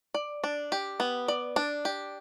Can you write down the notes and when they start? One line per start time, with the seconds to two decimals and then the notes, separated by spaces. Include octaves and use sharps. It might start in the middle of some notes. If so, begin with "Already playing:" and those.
0.14 D5
0.44 D4
0.72 G4
1.00 B3
1.28 D5
1.56 D4
1.85 G4